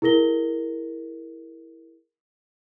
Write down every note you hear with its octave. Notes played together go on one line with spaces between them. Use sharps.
E4 G#4 A#4 A#6 G7